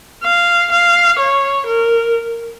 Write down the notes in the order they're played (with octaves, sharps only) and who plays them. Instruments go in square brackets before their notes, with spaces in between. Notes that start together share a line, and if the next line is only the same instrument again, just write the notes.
[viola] F5
F5
C#5
A#4